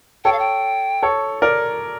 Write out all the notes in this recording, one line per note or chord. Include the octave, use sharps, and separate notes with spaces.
A4 C#5 G5
F5
G5
A4 C#5
A#4 D5